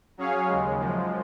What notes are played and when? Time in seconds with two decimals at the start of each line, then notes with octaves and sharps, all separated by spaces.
0.18 F#3 C#4 G#4 C#5 F5
0.48 D#2 C#3 G#3
0.78 F#2 F3 G#3